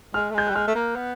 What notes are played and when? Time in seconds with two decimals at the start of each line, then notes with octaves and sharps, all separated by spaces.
0.14 G#3 F6
0.30 A3
0.34 G#3 G6
0.47 F#6
0.50 G3
0.55 G#3 F6
0.68 A3
0.75 A#3
0.96 B3